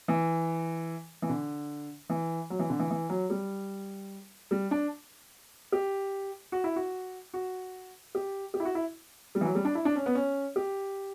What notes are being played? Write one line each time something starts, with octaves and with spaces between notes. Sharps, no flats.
E3
E3
D3
E3
F#3
E3
D3
E3
E3
F#3
G3
G3
D4
G4
F#4
E4
F#4
F#4
G4
G4
E4
F#4
E4
G3
E3
F#3
G3
D4
E4
D4
C#4
B3
C#4
G4